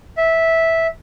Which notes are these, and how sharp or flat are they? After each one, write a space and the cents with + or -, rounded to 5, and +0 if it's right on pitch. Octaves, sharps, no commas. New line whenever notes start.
E5 -10